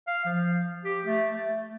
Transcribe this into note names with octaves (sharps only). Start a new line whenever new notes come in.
F5
F3
G4
A3
A3